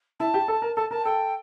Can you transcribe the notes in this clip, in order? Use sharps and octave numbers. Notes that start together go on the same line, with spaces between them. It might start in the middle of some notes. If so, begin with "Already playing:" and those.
E4 A5
G4
A4
A#4
A4 A5
A#4 A5
A4 G5